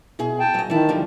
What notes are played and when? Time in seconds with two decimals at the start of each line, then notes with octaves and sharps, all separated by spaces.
0.19 B2 E4 G#4
0.39 G5 A5
0.54 F#3 D#5
0.70 D#3 E3 E4 A5
0.89 D3 F3 G3